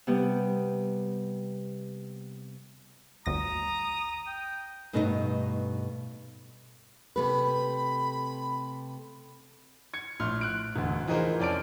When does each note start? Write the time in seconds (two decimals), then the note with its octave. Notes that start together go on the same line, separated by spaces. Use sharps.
0.07 C3 G3 B3
3.26 G1 D2 A#5 D#6 A#6
4.27 G5
4.93 G2 B2 A3 D#4 G4 D#5
7.16 C3 A3 B4 B5
9.94 G#6 C#7
10.20 A#1 A2 C6 F6
10.41 F#6 D7
10.76 E1 D2
11.08 E3 F3 D#4 G#4 A#4 C5
11.40 F2 C#4 D5 A5 F6 D7